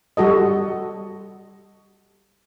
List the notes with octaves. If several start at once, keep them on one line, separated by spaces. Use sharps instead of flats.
G3 F#4 A4 D#5